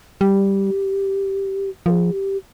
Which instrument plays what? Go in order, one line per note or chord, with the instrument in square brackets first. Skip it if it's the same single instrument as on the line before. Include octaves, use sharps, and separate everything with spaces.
[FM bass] G3 [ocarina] G4
[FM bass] F3 [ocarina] A#4
[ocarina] G#4
G4